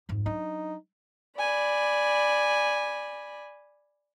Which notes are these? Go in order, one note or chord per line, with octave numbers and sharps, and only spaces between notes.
F2 G#2
F#3 D4 D#4
D5 G#5 B5